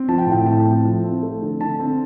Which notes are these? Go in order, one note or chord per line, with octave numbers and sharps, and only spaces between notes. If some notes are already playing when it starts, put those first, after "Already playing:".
Already playing: C4
F3 A5
G5
A2
G5
A2 A5
C4
F3
C4
A3
D3
D3 A5
C4